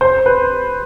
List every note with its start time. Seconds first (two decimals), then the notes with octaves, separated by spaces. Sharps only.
0.01 C5
0.26 B4